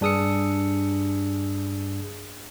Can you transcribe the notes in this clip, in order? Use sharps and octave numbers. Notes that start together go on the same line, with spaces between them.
G2 D4 G#4 D#6 E6 C#7